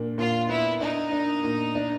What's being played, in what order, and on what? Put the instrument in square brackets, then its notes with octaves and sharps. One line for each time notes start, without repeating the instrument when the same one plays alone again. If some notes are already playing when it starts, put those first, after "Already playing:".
Already playing: [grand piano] A#2 D4
[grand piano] A#2 [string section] F4
[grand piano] B3 [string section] E4
[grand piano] D4 [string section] D#4
[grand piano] D4
A#2
D4